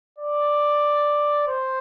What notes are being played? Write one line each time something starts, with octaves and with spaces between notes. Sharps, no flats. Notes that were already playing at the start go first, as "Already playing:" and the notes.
D5
C5